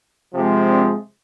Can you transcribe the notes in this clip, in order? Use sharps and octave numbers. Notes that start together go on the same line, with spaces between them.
C3 F3 G#3
C4 D4